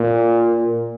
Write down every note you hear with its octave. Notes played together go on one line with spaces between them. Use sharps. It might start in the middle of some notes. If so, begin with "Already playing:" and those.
Already playing: A#2